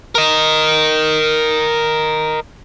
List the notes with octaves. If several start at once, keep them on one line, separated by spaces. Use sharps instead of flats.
A#4 D#5